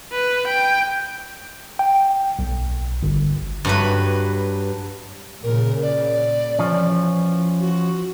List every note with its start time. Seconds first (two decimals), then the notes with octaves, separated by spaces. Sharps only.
0.12 B4
0.47 G5
1.79 G5
2.39 B1
3.03 G1
3.65 G2 F#3 B4
5.43 A#2 C#3 A#4
5.82 D5
6.59 E3 F3 C#4
7.60 F#4